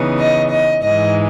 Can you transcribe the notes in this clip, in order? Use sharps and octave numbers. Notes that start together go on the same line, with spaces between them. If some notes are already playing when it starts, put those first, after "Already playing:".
Already playing: C#3 E3 B3 D#4
D#5
D#5
G#2 E3 G#3 D#4 D#5